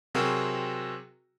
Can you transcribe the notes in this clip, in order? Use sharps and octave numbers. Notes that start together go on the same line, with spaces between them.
C3 F#3 C4 F#4 G#4 A#4